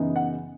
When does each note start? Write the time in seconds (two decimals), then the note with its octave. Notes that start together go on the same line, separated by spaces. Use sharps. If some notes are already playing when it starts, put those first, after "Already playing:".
Already playing: F#2 C#3 E3 B3 D#4
0.16 F#5